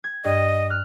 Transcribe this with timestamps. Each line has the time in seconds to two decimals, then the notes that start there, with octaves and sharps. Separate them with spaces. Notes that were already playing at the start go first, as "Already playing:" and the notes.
0.04 G#6
0.24 G2 D#5
0.70 F6 F#6